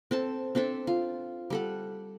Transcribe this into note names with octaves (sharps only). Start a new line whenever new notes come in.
C4 A4 A5
C4 D4 A4 E5
F4
G3 A4 F#5